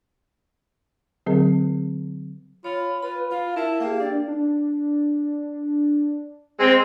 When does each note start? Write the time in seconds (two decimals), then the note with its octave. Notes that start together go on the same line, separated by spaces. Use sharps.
1.26 D3 F#3 C4 G#4 A#4
2.64 F4 C#5 B5
3.02 F4 B4 B5
3.31 F4 F5
3.56 E4 A#4 E5 A5
3.80 A#3 G4 G#4 F5 G5
4.00 D4 D5
4.28 D4
6.59 G#3 C4 E6